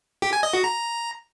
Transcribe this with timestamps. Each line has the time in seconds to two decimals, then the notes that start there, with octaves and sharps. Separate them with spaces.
0.22 G4
0.33 G#5
0.43 D#5
0.53 F#4
0.64 A#5